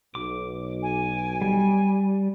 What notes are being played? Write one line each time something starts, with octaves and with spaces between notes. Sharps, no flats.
B1 D6
G#5
G3